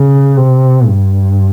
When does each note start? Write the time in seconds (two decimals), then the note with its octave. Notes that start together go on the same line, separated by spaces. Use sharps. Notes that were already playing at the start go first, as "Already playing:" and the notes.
Already playing: C#3
0.37 C3
0.87 G2